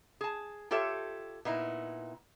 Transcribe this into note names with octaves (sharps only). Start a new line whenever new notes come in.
G#4 A5
F4 G4 A4 C#5 E5
A#2 B3 D#4 E4